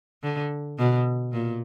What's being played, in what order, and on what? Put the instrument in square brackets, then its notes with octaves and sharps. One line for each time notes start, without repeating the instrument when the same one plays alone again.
[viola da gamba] D3
B2
A#2